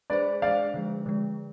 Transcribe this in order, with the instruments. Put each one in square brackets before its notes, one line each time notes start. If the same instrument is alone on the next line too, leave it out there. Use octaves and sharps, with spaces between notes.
[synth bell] G#3 D4 G#4 C5 [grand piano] B4 D5
[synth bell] G#3 D4 G#4 C5 [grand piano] D5 F5
[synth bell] D3 F3 G#3
D3 F3 G#3